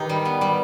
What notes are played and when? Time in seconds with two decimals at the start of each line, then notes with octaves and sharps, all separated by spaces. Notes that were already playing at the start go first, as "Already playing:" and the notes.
Already playing: D#3 D#4 G4 B4
0.09 G3
0.25 B3
0.41 G3